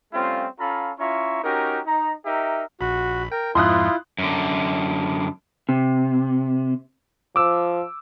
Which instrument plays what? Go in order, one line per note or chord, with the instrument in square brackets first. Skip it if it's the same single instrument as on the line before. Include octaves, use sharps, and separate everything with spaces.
[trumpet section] G3 A3 C4 C#4 F4
C#4 F4 A4 F5 A#5 B5
C#4 E4 F4 E5 A#5 C#6
C#4 D#4 F#4 G4 A#4
D#4 A#5
D#4 G4 A#4 E5
[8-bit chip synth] A#1 B5 [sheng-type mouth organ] F#4
[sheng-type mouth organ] A#4 [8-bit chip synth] G5
[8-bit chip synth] F2 G#2 F3 [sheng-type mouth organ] E4 F4 [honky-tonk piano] C6 D#6 F#6
[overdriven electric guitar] F#2 D3
[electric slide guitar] C3
[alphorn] F3 [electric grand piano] D6 E6